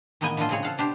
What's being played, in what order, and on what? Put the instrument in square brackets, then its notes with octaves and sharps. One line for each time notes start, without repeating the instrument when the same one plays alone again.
[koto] A2 D#3 A#3 B3 D#5 G#5
A2 D3 F3 A3 F4 D#5
C#3 G#3 C4 G#4 C#5
A4 F5 F#5
B2 D4 G4 C5